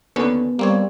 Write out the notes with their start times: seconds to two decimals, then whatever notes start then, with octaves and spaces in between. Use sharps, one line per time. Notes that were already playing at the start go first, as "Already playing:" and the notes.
0.16 D#2 D3 B3 C#4
0.59 G3 A#3 C4 C#5